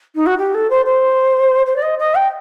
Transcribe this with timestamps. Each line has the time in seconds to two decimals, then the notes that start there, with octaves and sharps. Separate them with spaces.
0.15 D#4
0.26 F#4
0.38 G4
0.54 A4
0.70 C5
0.85 C5
1.66 C5
1.76 D5
1.82 D#5
1.99 D#5
2.15 G5